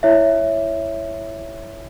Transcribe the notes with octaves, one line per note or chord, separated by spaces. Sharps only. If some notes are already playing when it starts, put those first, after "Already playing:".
E4 C#5 E5